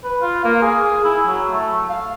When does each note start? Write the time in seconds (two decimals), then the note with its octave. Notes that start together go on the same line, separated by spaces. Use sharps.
0.04 B4
0.21 F4
0.45 A#3
0.62 G#4
1.04 E4
1.26 F#3
1.50 A3
1.90 F5